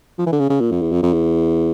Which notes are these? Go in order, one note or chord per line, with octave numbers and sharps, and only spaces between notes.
F3
E3
D3
C#3
C#3
A#2
F2
E2
F2
F2
E2